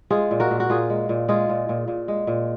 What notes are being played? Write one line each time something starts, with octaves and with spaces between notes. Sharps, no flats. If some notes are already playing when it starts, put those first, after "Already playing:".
G#3 F4 G#4
A#2
F#4 A#4
A#2
F#4
A#2 F4 G#4
G#3
A#2
G#3 F4 G#4
A#2
A#2
A#2
G#3
A#2